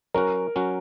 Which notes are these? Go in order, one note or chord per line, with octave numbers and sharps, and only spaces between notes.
F#3 C#4 F#4 A#4
F#3 C#4 F#4